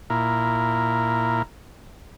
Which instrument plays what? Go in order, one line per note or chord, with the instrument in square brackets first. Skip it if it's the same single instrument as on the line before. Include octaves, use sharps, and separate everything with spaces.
[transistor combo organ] A#2 E4 A#4